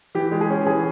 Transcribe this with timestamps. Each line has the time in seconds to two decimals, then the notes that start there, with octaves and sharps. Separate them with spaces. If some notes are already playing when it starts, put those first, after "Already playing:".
0.15 E3 G4
0.32 G#3
0.41 G#4
0.50 C#4
0.66 E3 G#4